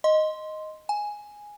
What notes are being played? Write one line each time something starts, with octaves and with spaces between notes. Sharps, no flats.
D#5 C6
G#5